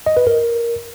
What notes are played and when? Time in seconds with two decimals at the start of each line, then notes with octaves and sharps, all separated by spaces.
0.06 D#5
0.17 B4
0.27 A#4